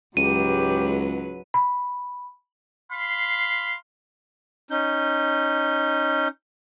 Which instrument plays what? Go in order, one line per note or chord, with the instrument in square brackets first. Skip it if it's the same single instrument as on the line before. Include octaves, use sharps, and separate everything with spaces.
[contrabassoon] C#2 [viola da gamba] G#2 F#3 B4 [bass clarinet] G4 [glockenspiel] D#7
[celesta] B5
[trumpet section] F5 B5 C6
[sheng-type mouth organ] C#4 D#4 G6